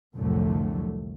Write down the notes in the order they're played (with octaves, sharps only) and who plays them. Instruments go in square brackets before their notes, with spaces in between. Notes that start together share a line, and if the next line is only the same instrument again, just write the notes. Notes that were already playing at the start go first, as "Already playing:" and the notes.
[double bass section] C2 F2 A2 D3 F#3 A3